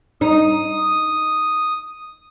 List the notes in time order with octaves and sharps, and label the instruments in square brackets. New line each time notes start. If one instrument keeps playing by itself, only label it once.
[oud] D#4 [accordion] D#6